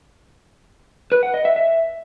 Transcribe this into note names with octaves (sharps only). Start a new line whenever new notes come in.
B4
F#5
D#5
E5
E5